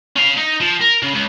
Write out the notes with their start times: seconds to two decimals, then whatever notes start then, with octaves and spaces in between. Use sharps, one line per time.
0.17 C#4 F5
0.38 D#4
0.61 F3
0.81 A#4
1.03 C#3
1.15 C#2